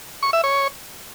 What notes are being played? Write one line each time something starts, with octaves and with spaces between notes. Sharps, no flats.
C#6
E5
C#5